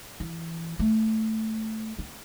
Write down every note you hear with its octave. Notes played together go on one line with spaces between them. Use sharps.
E3
A3
C4